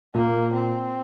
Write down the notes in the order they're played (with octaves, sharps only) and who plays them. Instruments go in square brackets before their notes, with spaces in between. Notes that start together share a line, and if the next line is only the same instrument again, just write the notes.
[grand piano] A#2 [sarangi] A#3
[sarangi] C4